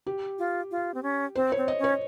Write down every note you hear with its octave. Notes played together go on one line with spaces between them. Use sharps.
G4
F4
F4
C4
C#4
C4 C5
C#5
C4
D#5
C#4
C#5